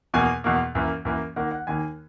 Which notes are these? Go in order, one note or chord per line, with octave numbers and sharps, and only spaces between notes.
E2 B2 A#3 G#5
E2 B2 A#3
F#2 E3 A#3
F#2 E3 A#3
D#2 D#3 A#3 F#5
F#5
D#2 D#3 A#3 G#5